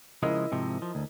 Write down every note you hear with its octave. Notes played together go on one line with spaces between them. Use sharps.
C#3 F3 G#3 E4 A#4 D#5
G#2 C3 F3
F3
D2